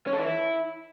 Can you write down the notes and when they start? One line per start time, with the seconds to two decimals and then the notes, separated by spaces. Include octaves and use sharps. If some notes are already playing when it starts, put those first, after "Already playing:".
0.07 C#4
0.13 A4
0.19 E3
0.25 E4